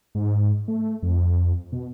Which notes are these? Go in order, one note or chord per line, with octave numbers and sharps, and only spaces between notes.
G#2
A3
F2
B2